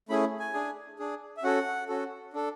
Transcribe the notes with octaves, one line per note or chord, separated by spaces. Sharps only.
A3 C#4 E4 G#4 B5
G#5
D4 G#4
D4 G#4
E5
C#4 F#4 A4 F#5
C#4 F#4 A4
D4 A4